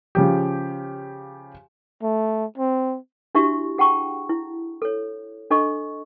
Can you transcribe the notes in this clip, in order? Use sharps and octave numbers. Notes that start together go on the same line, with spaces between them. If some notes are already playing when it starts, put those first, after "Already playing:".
C#3 F3 G4
A3
C4
D4 E4 F#4 G4 E5 C#6
G#4 F#5 G5 A5 C#6
E4
A4 C#5
D4 A4 D#5 C#6